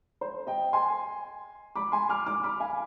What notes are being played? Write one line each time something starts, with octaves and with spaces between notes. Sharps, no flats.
C5
D#5 G5
G#5 C6
B5 D6
G#5 C6
D6 F6
D6 F6
B5 D6
F5 G#5